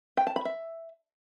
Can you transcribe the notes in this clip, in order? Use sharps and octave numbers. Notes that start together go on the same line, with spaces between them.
G5
A5
B5
E5